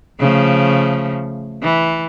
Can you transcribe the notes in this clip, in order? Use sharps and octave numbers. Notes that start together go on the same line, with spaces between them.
C#3 F3 A3
E3